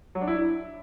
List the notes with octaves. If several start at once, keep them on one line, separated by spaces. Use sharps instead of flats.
F#3
D4
E4